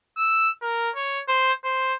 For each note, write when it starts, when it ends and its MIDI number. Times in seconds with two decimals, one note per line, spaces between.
0.17 0.49 88
0.62 0.90 70
0.96 1.20 73
1.28 1.52 72
1.64 1.95 72